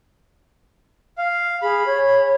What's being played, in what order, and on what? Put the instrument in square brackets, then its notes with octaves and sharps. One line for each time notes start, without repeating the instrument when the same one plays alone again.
[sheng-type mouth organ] F5
[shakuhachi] G#4 [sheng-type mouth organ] B5
[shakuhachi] C#5